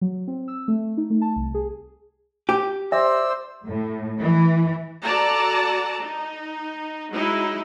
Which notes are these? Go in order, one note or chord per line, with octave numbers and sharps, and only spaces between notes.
F#3
C4
E6
A3
D#4
A3
A5
C2
G#4
G4
C5 D5 E5 E6
A2
E3
F#4 A4 D5 A5 A#5
D#4
F#3 G#3 D#4 E4